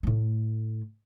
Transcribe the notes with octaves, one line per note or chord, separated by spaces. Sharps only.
A2 A3